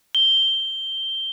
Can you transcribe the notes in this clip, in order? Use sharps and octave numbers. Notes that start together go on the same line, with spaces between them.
G7